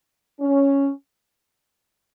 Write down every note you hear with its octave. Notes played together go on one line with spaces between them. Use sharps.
C#4